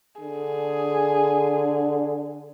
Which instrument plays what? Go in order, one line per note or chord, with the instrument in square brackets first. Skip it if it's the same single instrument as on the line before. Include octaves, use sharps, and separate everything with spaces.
[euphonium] D3 [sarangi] G#4